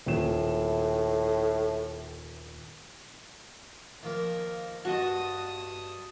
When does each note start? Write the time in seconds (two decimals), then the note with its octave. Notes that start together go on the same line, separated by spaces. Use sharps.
0.06 D#1 A2 E7
4.03 D#3 F3 A#3 A#4
4.85 G2 F#4 D#5 A5 D#6